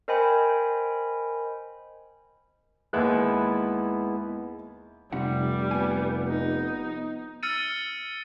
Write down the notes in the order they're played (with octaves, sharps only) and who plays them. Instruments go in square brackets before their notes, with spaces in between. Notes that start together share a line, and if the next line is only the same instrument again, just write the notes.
[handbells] A#4 C5 D#5 G5 G#5 B5
[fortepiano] D#2 E6 F#6 [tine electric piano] G#3 B3 E4
[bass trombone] F1 [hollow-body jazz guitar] C3 D#4 F#5 [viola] G3
[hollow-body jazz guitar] B3 G#5
[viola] D#4
[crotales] E6 F6 A6 C#7 D#7